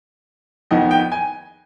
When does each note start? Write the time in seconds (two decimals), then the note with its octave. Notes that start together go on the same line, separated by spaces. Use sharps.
0.71 F2 D#3 B3 D#5
0.91 G5
1.12 G#5